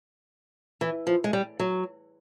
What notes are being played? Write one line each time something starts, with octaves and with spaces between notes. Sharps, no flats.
E3
F3
G#3
G3
F#3